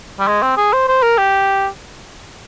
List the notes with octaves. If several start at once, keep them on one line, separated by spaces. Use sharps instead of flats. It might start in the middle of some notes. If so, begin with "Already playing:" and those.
G3
G#3
C4
G#4
C5
C5
A#4
G4